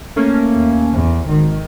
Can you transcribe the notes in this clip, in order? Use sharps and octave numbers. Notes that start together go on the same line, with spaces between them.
A3 A#3 C#4
D#2
E2
G#1 D#3